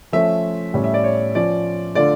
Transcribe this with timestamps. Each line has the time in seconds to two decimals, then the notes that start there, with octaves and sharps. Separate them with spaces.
0.13 F3 A3 C#4 E5
0.74 A2 G3 C#4
0.84 E5
0.94 D5
1.04 C#5
1.35 F3 C#4 F4 D5
1.95 D3 A3 D4 F4 D5